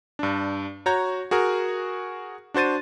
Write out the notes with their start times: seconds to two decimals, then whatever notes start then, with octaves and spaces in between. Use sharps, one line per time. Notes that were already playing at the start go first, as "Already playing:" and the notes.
0.19 G2 D4
0.86 F#4 C#5 A#5 G6
1.31 F#4 G#4 A#4
2.54 D4 F#4 C5 A6 D#7